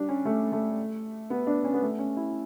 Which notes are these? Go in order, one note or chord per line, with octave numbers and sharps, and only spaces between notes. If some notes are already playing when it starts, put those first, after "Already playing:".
Already playing: G3 D4
C#4
A3
A3
B3
D4
C#4
B3
A3
C#4
E4